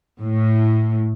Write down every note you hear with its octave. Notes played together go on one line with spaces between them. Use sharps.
A2